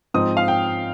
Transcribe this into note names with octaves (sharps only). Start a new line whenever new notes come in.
G#2 F3 C4 D#4 D#6
F5
G5